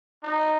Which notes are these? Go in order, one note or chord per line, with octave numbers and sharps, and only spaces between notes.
D#4